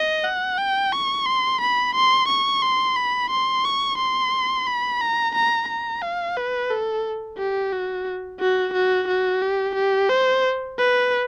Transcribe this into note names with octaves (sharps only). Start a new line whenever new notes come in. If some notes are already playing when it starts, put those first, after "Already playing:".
Already playing: D#5
F#5
G5
C#6
C6
B5
C6
C#6
C6
B5
C6
C#6
C6
B5
A#5
A#5
A#5
F5
B4
A4
G4
F#4
F#4
F#4
F#4
G4
G4
C5
B4